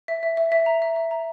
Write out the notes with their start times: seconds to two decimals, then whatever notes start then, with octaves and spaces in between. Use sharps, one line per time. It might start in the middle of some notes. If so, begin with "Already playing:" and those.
0.08 E5
0.23 E5
0.37 E5
0.52 E5
0.66 A#5
0.82 E5
0.96 E5
1.11 A#5